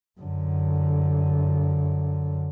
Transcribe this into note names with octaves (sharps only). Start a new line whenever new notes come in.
F#2 D3